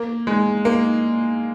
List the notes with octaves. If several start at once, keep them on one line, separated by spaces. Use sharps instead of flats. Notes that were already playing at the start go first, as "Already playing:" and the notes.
Already playing: A#3
G#3
A#3